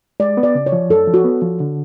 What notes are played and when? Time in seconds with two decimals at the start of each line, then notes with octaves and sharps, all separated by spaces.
0.20 G#3 D5
0.37 B3
0.43 D5
0.55 C#3
0.66 C#5
0.72 F3
0.90 F#2 A4
1.08 F3
1.14 F#4
1.24 B3
1.42 F3
1.60 D3